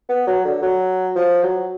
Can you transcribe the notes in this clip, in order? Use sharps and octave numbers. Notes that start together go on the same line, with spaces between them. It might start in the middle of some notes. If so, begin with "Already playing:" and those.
B3
F#3
D3
F#3
F3
F#3